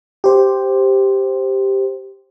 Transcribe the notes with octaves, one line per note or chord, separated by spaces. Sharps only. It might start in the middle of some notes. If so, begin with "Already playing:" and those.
G4 C5